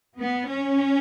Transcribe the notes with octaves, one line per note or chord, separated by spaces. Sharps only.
B3
C#4